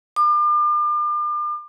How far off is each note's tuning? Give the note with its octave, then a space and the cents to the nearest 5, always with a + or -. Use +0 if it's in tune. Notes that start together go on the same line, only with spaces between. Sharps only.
D6 +40